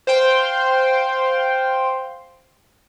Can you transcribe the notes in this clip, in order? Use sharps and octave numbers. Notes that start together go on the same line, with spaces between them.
C5 F5 G5 C6